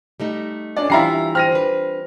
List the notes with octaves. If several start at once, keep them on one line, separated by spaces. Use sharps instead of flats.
G3 A3 D#4
C#4 D4 D5
E3 G3 D4 E4 F4 E5 A#5 C7
C4 F6 A#6 D#7
D4 B4